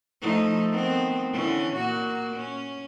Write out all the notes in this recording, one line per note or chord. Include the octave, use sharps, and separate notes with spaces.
F3 A3 D#4
D#3 B3 C4
D3 E3 C#4
A#2 A#3 F#4
C#4